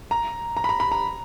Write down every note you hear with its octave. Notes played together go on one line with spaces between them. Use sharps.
A#5
A#5
B5
A#5
B5
A#5